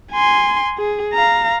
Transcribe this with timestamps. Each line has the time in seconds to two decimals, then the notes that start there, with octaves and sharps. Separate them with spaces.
0.12 G#5 C6
0.78 G#4
1.13 F5 A#5